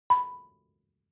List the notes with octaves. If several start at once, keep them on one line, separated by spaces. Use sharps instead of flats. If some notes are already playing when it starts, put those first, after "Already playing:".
B5